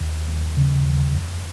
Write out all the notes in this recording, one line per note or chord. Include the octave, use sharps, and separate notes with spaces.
D#2
D#2
C#3
D#2
F2